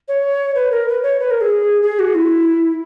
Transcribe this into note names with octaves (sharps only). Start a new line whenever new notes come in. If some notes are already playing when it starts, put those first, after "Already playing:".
C#5
B4
A#4
B4
C#5
B4
A#4
G#4
G#4
F#4
E4